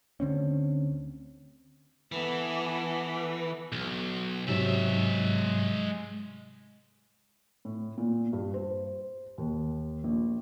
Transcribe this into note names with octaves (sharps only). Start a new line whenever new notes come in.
D2 D3 C4 C#4
E3 B3 A4
B1
G#2 C3 F#3 G#3 E5
A2
A#2
G2
C5
D#2
A#1